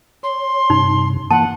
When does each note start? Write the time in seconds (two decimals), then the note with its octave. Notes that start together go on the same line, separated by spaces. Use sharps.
0.23 C#5 C6
0.70 G2 C3 D#4
1.31 E3 A#3 F#5 A5